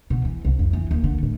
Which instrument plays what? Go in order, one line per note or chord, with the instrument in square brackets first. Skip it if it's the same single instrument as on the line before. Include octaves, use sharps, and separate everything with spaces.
[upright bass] B2
E3
C2
F2
E3
D#2
D3
A2